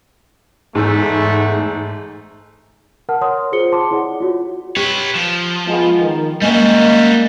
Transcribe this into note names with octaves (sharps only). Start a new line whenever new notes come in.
E2 G#2 A3
A#4 F#5 A5 F6
C#5 F#5 C6 D#6
F4 G#4 C5 C#7 G7
A5 C6 D6
E4 G#4 C#5 D5 F#5
F4 F#4 C#5
G4 B4 C#5
F3
G#3 B3 F4
D#3
G3 G#3 A#3 C#4 F#4 D#5